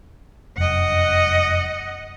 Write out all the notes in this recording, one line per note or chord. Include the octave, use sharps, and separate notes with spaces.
F1 F#2 D#5 F#5